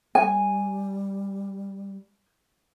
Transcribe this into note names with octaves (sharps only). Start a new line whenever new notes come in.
G3 G#5